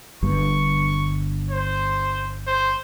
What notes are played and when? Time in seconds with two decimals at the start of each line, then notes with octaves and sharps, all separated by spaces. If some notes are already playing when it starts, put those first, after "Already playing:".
0.23 G1 G2 C#6
1.51 C5
2.47 C5